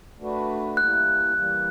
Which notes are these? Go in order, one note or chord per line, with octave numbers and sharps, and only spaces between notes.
A3 D4 F#4 B4
E3 G3 A#3 F#6
E3 G3 A#3